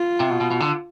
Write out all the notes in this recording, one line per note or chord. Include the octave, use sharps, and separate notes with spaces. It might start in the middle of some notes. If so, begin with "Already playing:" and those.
Already playing: F4
C3
B2
B2
B2
D3